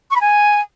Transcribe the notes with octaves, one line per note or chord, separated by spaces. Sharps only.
C#6
B5
G#5